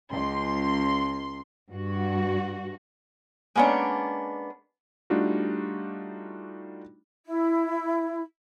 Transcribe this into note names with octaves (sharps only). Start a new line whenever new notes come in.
C#2 C6
G2 F#4
G#3 A#3 B3 C#4 D4
G3 A3 D4 D#4 F4 F#4
E4